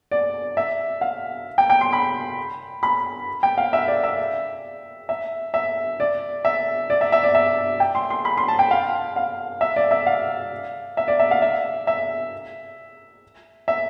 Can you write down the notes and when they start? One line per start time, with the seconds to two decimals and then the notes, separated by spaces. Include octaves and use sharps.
0.11 D5
0.57 E5
1.01 F5
1.58 G5
1.70 G5
1.81 C6
1.93 B5
2.83 B5
3.43 G5
3.58 F5
3.73 E5
3.88 D5
4.03 E5
5.09 E5
5.54 E5
6.00 D5
6.45 E5
6.90 D5
7.01 E5
7.12 E5
7.24 D5
7.35 E5
7.80 G5
7.95 C6
8.10 C6
8.25 B5
8.37 C6
8.48 A5
8.59 G5
8.71 F5
9.16 F5
9.61 E5
9.76 D5
9.91 E5
10.07 F5
10.97 E5
11.08 D5
11.20 E5
11.31 F5
11.42 E5
11.87 E5
13.68 E5